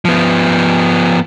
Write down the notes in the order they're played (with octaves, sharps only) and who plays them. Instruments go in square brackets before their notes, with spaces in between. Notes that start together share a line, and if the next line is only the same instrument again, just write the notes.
[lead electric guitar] F3 B3